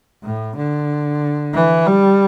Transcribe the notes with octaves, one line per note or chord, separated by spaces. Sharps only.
A2
D3
E3
G3